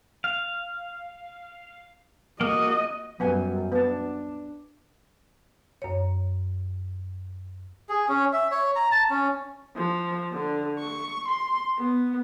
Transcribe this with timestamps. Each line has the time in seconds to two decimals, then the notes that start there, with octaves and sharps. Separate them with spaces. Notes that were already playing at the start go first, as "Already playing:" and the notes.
0.24 F5
2.41 A#3 F#4 D#5
3.20 F#2 G3 B3 F#5 G#5
3.72 B3 D4 A5
5.82 F#2 C#5
7.89 G#4
8.08 C#4
8.33 E5
8.51 C#5
8.76 A#5
8.91 A5
9.10 C#4
9.76 F3
10.32 D3
10.79 C#6
11.28 C6
11.78 B3